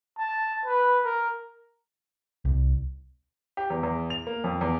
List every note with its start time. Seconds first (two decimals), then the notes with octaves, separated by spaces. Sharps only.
0.18 A5
0.66 B4
1.05 A#4
2.45 C2
3.57 G4
3.70 E2
3.83 E2
4.10 F7
4.27 A#3
4.44 F2
4.61 E2